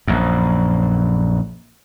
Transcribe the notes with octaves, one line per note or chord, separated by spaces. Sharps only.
A#1 F#2